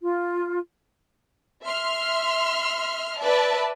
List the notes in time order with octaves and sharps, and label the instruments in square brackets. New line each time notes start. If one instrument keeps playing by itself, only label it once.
[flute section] F4
[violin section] E5 C6 F6
B4 D5 E5 A5